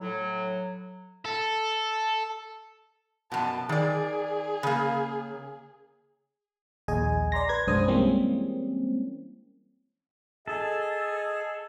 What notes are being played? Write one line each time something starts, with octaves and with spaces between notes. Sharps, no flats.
A2 F#3
A4
F#2 B2 A5
D#3 G#4 D5
C#3 A#3
A#1 D#2 G#4 D#5 G#5
D5 A#5 C6 A#6
B4 G#6
B1 F#2 G#3 D4 C5 D#6
E3 G3 G#3 A#3 C4 C#4
G#4 A4 D#5